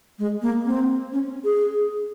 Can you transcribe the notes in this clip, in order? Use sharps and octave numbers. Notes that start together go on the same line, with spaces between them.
G#3
A#3
C4
C#4
G#4